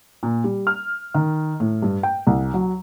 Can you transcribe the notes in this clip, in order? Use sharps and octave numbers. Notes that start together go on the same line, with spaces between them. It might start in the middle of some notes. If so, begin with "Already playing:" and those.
A#2
G3
F6
D#3
A2
G2
G5
C2
F#3